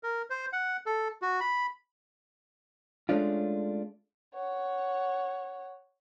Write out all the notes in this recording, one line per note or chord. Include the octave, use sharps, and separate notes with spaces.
A#4
C5
F#5
A4
F#4
B5
G#3 A3 C#4 D4 F4
C#5 F#5